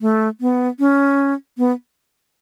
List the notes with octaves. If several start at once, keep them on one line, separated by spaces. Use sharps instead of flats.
A3
B3
C#4
B3